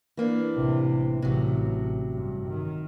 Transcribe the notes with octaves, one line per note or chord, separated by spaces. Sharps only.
E3 A#3 D4
A1 C3
A1 C3 F#3
G2
D#3